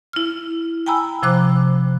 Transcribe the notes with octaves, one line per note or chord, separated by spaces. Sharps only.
E4 F6
G5 G#5 A#5 B5 E6
C3 F3 C5 D6 F#6